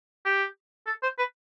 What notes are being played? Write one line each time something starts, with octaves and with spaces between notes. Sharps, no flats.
G4
A4
C5
B4